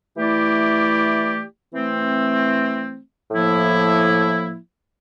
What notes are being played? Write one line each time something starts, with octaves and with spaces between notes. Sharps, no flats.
E3 A3 E4 G4 D5
E3 A3 C4
A2 F3 A#3 E4